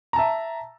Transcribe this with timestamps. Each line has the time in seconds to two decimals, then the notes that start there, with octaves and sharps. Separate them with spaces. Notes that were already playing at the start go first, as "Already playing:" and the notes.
0.13 A#5
0.16 A5
0.19 E5